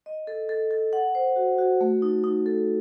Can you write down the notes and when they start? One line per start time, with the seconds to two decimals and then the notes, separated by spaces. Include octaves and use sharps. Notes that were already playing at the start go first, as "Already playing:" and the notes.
0.06 D#5
0.27 A4
0.49 A4
0.71 A4
0.93 F#5
1.15 C5
1.36 F#4
1.58 F#4
1.81 A3
2.02 D#4
2.24 D#4
2.46 A4